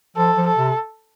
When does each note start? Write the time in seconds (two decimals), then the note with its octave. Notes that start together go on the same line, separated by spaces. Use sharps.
0.16 F3 A4
0.37 F3
0.47 A4
0.57 C3